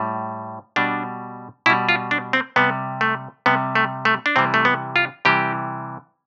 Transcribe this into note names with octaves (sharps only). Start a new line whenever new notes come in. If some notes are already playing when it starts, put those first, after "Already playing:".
Already playing: A2 G3
B2 G3 D4
B2 G3 E4
F4
D4
C4
C3 G3 B3
A3
C3 G3 B3
A3
A3
D4
C3 E3 G3 C4
A3
B3
F4
C3 E3 G3 G4